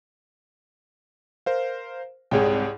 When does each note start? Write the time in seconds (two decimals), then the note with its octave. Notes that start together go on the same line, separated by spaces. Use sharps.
1.46 A#4 C5 F5
2.31 C2 G#2 G#4 C#5 G5